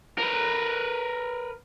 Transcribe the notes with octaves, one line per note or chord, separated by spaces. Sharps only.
A#4 B4